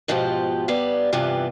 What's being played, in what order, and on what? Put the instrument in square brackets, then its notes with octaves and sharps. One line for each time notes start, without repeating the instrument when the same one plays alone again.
[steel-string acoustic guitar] G#2 B2 F3 F4 G4
G2 G3 B3 F5
G2 C3 E3 B3 F4